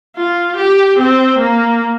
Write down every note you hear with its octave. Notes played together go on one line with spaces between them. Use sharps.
F4
G4
C4
A#3